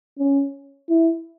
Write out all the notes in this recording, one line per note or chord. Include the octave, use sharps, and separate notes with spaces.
C#4
E4